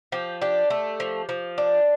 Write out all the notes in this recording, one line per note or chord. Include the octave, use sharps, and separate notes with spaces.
F3 G4
D4 G4
A3
F3
F3
D4